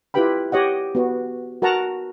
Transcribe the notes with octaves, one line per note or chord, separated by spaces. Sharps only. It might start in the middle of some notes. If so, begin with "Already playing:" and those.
E4 F4 G4 B4 G5 B5
G4 C#5 D#5 F#5
B3 F#4
F#4 A#4 F#5 A5 A#5